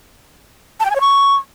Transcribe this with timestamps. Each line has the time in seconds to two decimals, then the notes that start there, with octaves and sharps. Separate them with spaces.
0.80 A5
0.85 G5
0.90 G#5
0.96 C#5
1.01 C#6